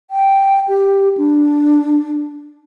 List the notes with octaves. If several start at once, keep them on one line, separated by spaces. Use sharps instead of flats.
G5
G4
D4